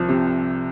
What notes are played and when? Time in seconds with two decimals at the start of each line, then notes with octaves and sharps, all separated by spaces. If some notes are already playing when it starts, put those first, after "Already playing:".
Already playing: C2 F3
0.09 C3